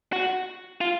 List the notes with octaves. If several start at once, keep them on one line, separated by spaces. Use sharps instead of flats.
F#4
F4